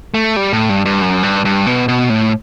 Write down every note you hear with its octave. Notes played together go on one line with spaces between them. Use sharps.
A3
G3
A2
G2
G2
F#2
G2
G2
B2
B2
A2